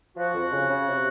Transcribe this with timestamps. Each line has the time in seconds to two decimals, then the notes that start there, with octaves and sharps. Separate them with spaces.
0.17 F3 F#4
0.34 F2
0.52 C#3
0.68 C#3
0.87 C3